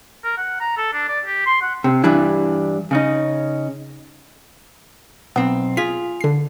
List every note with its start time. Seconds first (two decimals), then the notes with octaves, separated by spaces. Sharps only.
0.24 A#4
0.37 F#5
0.61 A#5
0.77 A4
0.93 D4
1.08 D5
1.25 G4
1.46 C6
1.62 F#5
1.84 C3
2.04 G2 E3 G3 D4 E4
2.91 C#3 C#4 D#4
5.36 B1 B3 C4
5.77 F4 G#4 B6
6.21 D3 C7